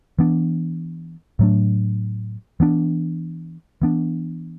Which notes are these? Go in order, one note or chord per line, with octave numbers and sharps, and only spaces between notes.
E3 B3 D4
A2 F#3 A3 D4
E3 B3 D4
E3 B3 D4